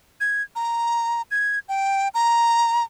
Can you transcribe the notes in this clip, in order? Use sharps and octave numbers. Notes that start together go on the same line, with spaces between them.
G#6
A#5
G#6
G5
A#5